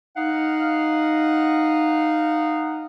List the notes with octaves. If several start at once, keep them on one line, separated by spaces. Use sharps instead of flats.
D#4 F5 F#5